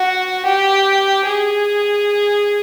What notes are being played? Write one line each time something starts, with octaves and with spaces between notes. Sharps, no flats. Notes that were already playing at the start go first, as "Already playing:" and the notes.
Already playing: F#4
G4
G#4